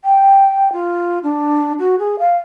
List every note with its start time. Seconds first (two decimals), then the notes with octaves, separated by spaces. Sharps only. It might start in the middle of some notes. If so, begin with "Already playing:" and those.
0.05 G5
0.73 F4
1.23 D4
1.79 F#4
1.99 G#4
2.19 F5